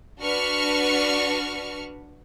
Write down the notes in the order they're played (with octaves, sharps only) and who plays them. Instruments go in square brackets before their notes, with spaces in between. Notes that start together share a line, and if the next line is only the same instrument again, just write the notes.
[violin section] D4 F#4 B4 C#6 F6